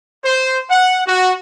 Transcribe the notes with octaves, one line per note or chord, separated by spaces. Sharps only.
C5
F#5
F#4